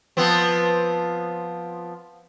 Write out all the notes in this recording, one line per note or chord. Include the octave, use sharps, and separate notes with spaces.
F3 B3 C4